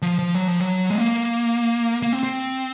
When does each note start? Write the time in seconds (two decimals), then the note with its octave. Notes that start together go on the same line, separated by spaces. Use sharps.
0.02 F3
0.19 F3
0.35 F#3
0.48 F3
0.60 F#3
0.90 G#3
0.97 A#3
2.02 A#3
2.13 C4
2.23 C4